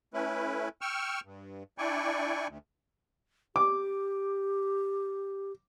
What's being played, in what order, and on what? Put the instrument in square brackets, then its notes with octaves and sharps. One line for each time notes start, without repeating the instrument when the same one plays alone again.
[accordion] A3 C#4 E4 B4
G5 C#6 E6 F6
G2
D4 E4 D5 G5 G#5 C#6
D2
[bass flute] G4 [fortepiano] D6